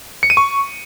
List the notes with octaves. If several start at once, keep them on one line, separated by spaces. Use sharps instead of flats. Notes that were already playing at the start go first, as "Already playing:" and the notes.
C#7
D#7
C#6